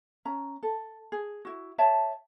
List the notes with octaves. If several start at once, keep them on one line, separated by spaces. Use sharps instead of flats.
C#4 A#5
A4
G#4
E4 F#4
C#5 E5 G5 A5